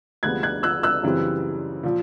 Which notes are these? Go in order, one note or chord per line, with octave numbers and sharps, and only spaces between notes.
D2 C3 F3 G#3 B3 F#6 G#6
F#6 G#6
E6 F#6
E6 F#6
F#2 C#3 E3 G3 C4
A#2 F3